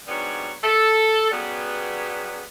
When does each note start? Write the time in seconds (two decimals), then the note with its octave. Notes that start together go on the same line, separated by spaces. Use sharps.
0.08 G#2 F#3 G3 B3 D4 C#5
0.64 A4
1.31 C#3 F#3 G3 B3